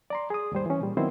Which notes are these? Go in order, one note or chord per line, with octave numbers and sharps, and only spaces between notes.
D5 A#5 C6
G#4 D#6
D#2 G#2 G3 C5
E3 C#4
A#2 G3
D#3 F#3 B3 C4 E4 C5